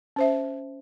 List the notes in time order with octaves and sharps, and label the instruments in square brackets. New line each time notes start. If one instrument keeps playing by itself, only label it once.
[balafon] C#4 C5 E5